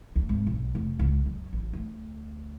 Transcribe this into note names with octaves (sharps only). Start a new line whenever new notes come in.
D2
G#1
B1
F1
C#2
F#2
A1
D2